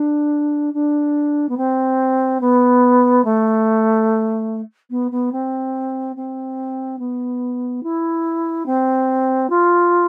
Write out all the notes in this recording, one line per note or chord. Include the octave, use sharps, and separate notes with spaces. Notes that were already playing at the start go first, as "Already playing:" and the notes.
Already playing: D4
D4
B3
C4
B3
A3
B3
B3
C4
C4
B3
E4
C4
F4